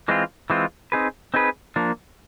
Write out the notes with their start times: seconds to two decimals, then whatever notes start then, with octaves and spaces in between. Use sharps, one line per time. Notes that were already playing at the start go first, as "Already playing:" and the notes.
0.08 E3 G#3 C4 F4
0.50 E3 G#3 C4 F4
0.92 C4 D#4 G#4 B4
1.34 C4 D#4 G#4 B4
1.76 F3 A#3 D4